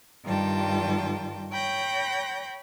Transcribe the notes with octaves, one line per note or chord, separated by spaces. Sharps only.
G2 D#3 G3 F4 G5 A5
C#5 G5 B5 G6 A#6